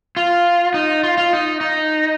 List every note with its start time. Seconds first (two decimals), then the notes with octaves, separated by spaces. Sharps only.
0.17 F4
0.74 D#4
1.03 F4
1.17 F4
1.33 D#4
1.61 D#4